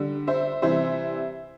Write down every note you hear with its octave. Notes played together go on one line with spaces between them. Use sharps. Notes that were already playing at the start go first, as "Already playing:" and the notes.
Already playing: D3 G3
C5 E5
C3 E3 G3 C5 E5